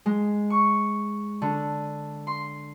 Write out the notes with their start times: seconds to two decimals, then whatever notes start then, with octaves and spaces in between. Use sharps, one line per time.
0.06 G#3
0.50 C#6
1.42 D3
2.27 C6